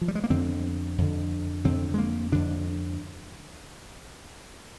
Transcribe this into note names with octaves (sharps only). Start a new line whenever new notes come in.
F3
G3
G#3
A#3
F2 D3 C4
F2 D3
F2 D3 C4
G#3
A#3
F2 D3 D4